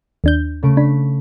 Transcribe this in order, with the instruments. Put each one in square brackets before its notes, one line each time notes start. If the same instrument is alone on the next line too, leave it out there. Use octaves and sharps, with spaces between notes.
[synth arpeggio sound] D#2 D4 G6
[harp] C#3 A3 D7
[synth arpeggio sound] D4 [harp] B5